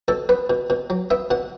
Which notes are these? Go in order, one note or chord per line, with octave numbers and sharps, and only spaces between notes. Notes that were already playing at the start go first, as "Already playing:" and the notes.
B2 A4
B3 B4
B2
B2
F#3
B3 E5
B2 F#5